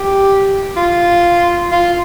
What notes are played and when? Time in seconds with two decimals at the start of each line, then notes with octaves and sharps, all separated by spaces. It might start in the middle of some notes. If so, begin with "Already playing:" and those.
Already playing: G4
0.77 F4
1.72 F4